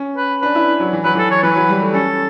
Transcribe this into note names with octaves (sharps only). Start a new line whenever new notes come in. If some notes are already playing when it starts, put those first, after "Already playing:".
Already playing: C#4
B4
D4 B4
E4
F#3
E3
F#3 B4
E3 A4
C#5
E3 B4
F#3
G3
A3
C#4 A4